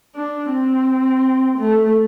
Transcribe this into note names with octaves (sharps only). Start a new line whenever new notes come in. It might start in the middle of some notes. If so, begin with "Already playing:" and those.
D4
C4
A3